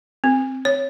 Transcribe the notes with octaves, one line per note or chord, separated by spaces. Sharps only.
C4
C#5